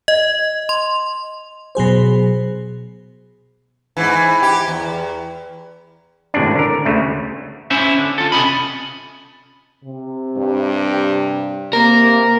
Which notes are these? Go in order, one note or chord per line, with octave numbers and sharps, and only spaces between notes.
D#5
C6
B2 F#3 G#4 C5
G#2 E3
G4
E2
G#1 A2 C3 C#4 D4
D3 A#4
D2 C#3 A3
C#4 E4 C5 E5
D3
F4 A4
C3 C#4 D#5 B5
C3
G2
C3 A#3 A#4